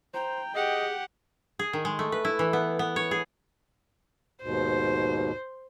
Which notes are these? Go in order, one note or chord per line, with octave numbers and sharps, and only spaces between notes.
C5 G5 A#5
G4 G#4 D#5 F#5
G#4
D#3
G#3
A3
B4
E4
E3
B3
B3
C#5
G#4
D#2 G#2 B2 C5